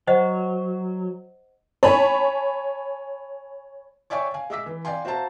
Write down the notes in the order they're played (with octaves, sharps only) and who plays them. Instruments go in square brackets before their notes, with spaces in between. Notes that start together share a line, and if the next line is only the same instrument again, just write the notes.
[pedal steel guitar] F#3 [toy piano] C5 D#5 F#5
[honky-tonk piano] C#5 G#5 A5 B5
[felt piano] C#5 D5 E5 G5 G#5 C#6
F5 G#5
G#3 E5 D6 E6 B6
E3
D5 F5 G5 G#5 C6
F#4 C5 E5 F5 A5 A#5